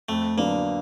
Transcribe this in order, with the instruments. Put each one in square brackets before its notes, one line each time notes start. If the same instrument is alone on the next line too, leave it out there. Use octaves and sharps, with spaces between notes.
[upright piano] F2 [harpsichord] A3
[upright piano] D3 F#3 B3 D4 [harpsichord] A#3